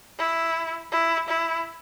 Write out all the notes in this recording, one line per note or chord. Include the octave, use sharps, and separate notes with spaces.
E4
E4
E4